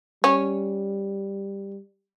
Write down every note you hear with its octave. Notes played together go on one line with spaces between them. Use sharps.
G3 C#4